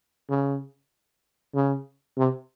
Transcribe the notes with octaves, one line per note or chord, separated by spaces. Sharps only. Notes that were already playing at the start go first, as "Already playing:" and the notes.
C#3
C#3
C3